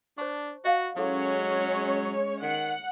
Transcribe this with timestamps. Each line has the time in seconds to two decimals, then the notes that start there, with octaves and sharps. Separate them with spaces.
0.18 D4 C5 A5 C#6
0.65 F#4 D#5 F5 F#5
0.97 F#3 G#3 C#4 E4 A4 C#5 C6
2.42 D#3 F#5